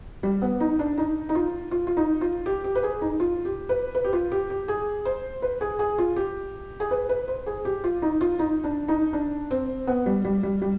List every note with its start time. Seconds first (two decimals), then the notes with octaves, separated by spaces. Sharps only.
0.23 G3
0.42 B3
0.60 D#4
0.79 D4
0.98 D#4
1.29 D#4
1.35 F4
1.71 F4
1.87 F4
1.97 D#4
2.21 F4
2.46 G4
2.64 G4
2.75 B4
2.83 G#4
3.01 D#4
3.20 F4
3.45 G4
3.69 B4
3.95 B4
4.04 G4
4.13 F4
4.32 G4
4.50 G4
4.68 G#4
5.05 C5
5.42 B4
5.61 G#4
5.79 G#4
5.98 F4
6.16 G4
6.80 G#4
6.91 B4
7.09 B4
7.28 C5
7.46 G#4
7.65 G4
7.84 F4
8.02 D#4
8.21 F4
8.39 D#4
8.64 D4
8.88 D#4
9.13 D4
9.51 C4
9.87 B3
10.06 G3
10.25 G3
10.43 G3
10.62 G3